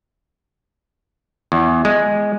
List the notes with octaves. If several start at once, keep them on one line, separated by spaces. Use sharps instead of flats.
E2
G#3